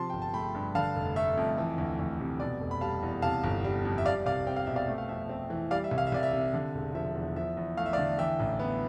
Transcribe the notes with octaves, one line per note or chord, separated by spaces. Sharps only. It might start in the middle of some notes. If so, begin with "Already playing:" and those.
Already playing: C3 F3 A5 C6
G1 G5
A5
A3 G5 B5
G2
D3 F5 A5
F1
A3 E5
F2
E3
D2
D2
C3
B2 D5
F1
B5
G3 F5 A5
E2
C3 F5 A5
G1
G3
F2
E5
G3 D5 F5
C2 D5 F5
C4 G5
F5
B2 E5
D5 F5
A3
F5
F2 E5
C4
E3
G3 D5 F5
E5
C2
F5
E5
C2 D5
E5
C3
D3
E1
F3 E5
E2
F3 E5
E2
A3 F5
E5
D5 F5
D3
E3 E5 G5
A1
B3